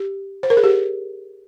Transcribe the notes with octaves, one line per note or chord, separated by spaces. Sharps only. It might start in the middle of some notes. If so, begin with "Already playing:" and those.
Already playing: G4
C5
A#4
G#4
G4